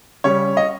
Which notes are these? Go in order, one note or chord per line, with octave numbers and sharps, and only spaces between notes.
C#3 G3 C#4 C#5
D#5